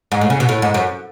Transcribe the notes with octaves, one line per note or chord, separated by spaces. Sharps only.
G#2
A2
C#3
B2
A2
G#2
F#2